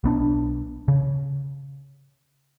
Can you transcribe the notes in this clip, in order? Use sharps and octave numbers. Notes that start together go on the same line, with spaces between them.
B1 B3 D4
C#3